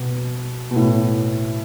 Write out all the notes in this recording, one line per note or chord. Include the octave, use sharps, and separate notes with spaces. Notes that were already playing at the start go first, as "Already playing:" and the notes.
Already playing: B2
B2
A2